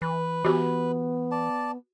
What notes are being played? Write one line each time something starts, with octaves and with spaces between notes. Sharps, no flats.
E3 B4
E3 B3 F#4 G4
D5 A5